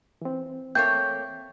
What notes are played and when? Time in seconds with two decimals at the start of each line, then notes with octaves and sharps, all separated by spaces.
0.22 E3 C4
0.75 A3 A#3 C#5 G5 G6